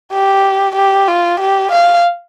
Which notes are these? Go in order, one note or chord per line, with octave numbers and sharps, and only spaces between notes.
G4
G4
F4
G4
F5